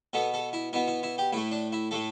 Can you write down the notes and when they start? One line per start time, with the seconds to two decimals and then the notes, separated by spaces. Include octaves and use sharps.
0.13 B2 B3 A4
0.34 A4
0.53 E4
0.73 B2 B3 E4
0.88 E4
1.03 E4
1.18 G4
1.32 A2 A3 E4
1.51 D4
1.72 E4
1.91 A2 A3 A4